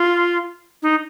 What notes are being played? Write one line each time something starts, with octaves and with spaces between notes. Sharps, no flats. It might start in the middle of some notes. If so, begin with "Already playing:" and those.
Already playing: F4
D#4